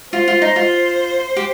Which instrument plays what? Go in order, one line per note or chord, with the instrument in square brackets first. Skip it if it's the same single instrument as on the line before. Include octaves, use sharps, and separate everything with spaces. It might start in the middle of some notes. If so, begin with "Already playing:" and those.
[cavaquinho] F4 [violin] C5
[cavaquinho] F4
D#4
F4
G4